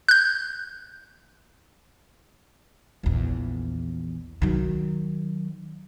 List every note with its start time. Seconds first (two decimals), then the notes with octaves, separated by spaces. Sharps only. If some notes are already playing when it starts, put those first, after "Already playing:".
0.09 F#6 G6
3.03 A#1 E2
4.42 D#3 F#3